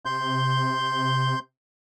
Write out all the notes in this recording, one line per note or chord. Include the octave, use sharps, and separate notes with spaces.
C3 C6 G6